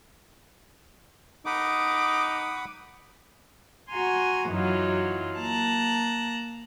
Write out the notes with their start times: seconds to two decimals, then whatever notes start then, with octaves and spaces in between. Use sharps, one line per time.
1.46 D#4 F#5 B5 D6 D#6
3.90 F#4 G#5 A#5 C6
4.49 F#2 E3 F#3 D#4 F4
5.39 A#3 A5 A#5 F#6